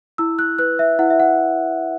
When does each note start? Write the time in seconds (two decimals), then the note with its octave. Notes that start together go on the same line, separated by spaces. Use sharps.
0.18 E4 E6
0.39 F#6
0.59 B4 F#6
0.79 E5
0.99 E4 F#5
1.10 E5
1.20 F#5